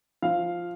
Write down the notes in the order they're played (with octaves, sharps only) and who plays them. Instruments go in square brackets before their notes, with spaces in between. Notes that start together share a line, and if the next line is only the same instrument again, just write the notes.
[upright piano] F3 F5